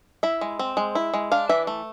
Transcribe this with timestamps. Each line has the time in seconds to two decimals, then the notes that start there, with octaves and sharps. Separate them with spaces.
0.23 E4 E5
0.41 G#3
0.59 C4
0.77 G#3
0.95 E4
1.14 G#3
1.32 D4 F5
1.49 E3 E5
1.67 A3